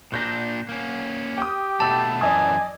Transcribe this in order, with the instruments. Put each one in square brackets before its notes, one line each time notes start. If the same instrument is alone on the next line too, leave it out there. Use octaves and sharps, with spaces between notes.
[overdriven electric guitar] A#2 D4 [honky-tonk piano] F#6 G6 A#6
[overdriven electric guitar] A#3 C#4
[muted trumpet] G4 [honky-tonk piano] G5 D#6
[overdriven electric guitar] B2 A3 [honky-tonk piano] G5 B5 E6 [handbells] A5
[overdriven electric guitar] F#2 E3 [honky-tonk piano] D5 D#5 D#6 [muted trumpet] G#5